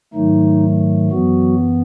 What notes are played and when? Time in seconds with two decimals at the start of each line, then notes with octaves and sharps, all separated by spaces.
0.14 G#2 D#3 F#3 A3 D#4
1.11 F#2 E3 F#3 B3 F#4